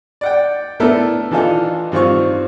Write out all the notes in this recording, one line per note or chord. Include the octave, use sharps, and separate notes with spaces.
D5 F#5 G5
A3 B3 D4 E4 A4 A#4
D#3 E3 D4 D#4 F4 A4
G2 D#3 C4 F4 C#6